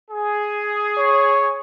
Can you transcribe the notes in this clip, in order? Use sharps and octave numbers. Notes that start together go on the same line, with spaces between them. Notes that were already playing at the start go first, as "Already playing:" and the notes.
G#4
C#5